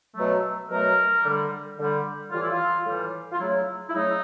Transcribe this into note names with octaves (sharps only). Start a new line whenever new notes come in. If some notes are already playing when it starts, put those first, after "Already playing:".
B2 F#3 A3
B2 F#3 A3 A#4
D3 G3
D3 G3
A2 E3 G3 F4
E4
F4
A2 E3 G3
F4
C#3 F#3 A3 E4
E4
C#3 F#3 A3 D#4